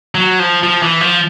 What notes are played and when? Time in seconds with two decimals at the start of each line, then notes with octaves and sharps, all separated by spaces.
0.15 F#3
0.39 F3
0.63 F3
0.82 E3
1.01 F3